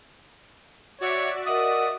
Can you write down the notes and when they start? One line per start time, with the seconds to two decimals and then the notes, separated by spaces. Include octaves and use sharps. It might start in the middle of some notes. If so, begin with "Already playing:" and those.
1.01 F#4 C#5 D5 E5
1.46 A#4 D#5 F#5 D#6